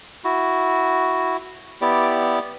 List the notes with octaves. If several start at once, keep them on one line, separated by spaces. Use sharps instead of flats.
E4 F#4
B3 E4 G4 D5